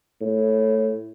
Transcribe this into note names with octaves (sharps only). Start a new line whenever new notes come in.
A2